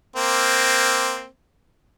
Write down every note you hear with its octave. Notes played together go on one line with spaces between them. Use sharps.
A#3 C4